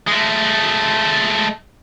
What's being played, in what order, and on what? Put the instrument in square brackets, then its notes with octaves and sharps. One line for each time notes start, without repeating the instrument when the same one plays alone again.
[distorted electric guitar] G#3 A3